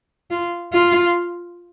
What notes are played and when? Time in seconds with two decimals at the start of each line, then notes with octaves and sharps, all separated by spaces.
0.31 F4
0.73 F4